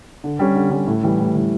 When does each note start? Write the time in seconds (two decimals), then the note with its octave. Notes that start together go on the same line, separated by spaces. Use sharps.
0.24 D3
0.39 G3 C#4
0.55 D3
0.71 G3 C#4
0.87 A2
1.03 E3 G3
1.19 A2
1.35 E3 G3